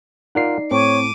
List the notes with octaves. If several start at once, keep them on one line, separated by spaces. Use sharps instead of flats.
D#4 F4 A#4 D5 F#5 C7
A2 C4 C#5 D6 D#7